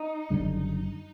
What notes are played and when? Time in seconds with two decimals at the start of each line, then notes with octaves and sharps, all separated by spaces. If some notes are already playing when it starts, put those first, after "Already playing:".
Already playing: D#4
0.30 F#1 F#2 D3 G3